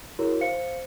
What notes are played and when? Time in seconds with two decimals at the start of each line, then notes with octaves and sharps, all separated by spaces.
0.19 E4 F#4 G#4 A#4 C#5
0.41 C5 F5 C#7